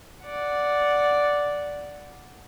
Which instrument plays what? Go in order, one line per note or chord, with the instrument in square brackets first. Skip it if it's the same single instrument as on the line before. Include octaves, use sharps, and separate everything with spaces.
[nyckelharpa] D5 F#5